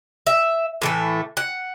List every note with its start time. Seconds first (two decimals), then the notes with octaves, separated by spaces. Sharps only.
0.27 E5
0.82 A2 E3 A3
1.37 F#5